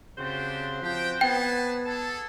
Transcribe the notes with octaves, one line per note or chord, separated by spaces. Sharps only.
C#3 C4 D4 F#4 G4 C5
F3 G4 G5
B3 G#4 B4 G5 A5
G#4 A4 A5